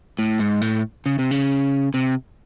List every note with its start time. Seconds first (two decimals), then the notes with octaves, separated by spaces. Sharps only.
0.19 A2
0.39 G#2
0.62 A2
1.06 C#3
1.19 C3
1.31 C#3
1.94 C3